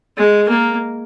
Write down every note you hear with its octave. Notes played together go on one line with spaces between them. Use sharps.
G#3
A#3